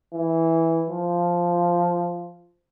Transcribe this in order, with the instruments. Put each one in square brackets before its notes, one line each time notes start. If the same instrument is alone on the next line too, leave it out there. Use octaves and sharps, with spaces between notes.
[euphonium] E3
F3